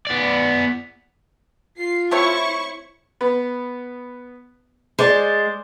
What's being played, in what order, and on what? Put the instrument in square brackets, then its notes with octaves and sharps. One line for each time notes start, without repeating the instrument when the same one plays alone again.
[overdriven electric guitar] B3 D5
[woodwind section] F4 [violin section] C7
[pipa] A3 C4 C#5 [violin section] E4 C#6
[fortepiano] B3
[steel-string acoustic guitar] G#3 [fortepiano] C5 D5